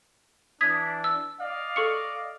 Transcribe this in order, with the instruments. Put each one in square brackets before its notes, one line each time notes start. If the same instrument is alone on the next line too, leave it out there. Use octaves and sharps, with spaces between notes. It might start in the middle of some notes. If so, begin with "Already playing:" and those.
[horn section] E3 D4 [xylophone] D#6 G#6 B6
[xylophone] E6
[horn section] D5 D#5 F5
[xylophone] A4 C#6 C#7